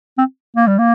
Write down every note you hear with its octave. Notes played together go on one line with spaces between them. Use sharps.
C4
A#3
G3
A#3